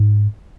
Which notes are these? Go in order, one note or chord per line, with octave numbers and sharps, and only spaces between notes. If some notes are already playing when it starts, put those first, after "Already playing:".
Already playing: G#2